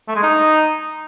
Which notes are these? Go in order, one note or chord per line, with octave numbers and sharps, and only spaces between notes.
A3
G#3
D#4